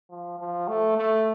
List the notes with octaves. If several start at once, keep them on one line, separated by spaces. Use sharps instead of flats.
F3
F3
A3
A3